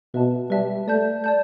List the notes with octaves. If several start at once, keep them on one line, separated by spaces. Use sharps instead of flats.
B2 B4 E5 A5
G3 B4 E5 A5
A3 D5 A5 G6
D5 A5 G6